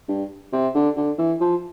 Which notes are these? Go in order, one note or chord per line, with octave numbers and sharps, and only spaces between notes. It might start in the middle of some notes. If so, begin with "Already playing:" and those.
G2
C3
D3
D3
E3
F3